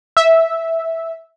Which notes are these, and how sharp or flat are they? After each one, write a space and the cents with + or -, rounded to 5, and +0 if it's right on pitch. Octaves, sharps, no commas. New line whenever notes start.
E5 -10